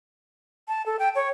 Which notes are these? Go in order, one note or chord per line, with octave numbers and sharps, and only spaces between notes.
A5
A4
G5
C#5